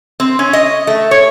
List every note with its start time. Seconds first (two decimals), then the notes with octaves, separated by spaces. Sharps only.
0.20 C4
0.39 C#4
0.53 D#5
0.87 A3
1.11 C#5